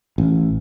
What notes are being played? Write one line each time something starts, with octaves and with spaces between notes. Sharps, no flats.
A1